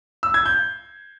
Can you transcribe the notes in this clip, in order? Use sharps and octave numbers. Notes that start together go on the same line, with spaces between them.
E6
G#6
G6